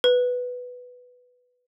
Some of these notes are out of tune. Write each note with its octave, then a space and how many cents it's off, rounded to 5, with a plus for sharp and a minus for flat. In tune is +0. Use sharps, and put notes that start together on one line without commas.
B4 +5